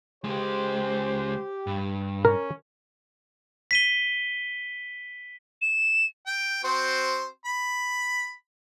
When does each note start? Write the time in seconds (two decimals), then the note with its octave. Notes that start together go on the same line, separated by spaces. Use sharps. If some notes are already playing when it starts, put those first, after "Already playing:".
0.24 C#2 G#3 G4 C5
1.67 G2
2.25 C#4 A#4
3.71 B6 D#7 G7
5.62 E7
6.27 G5
6.64 C4 F#4 C5
7.45 B5